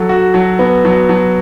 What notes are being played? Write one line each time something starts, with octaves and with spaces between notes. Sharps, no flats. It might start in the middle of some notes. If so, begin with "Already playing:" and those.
Already playing: F#3 A4
F#4
F#3
B3
F#3
F#3